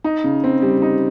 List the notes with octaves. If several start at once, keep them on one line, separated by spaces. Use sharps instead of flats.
D#4
C#3
C4
G3
D#4